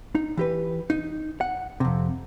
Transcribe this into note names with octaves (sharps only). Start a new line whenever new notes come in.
D#4
E3 G4 B4
D#4
F#5
F2 C3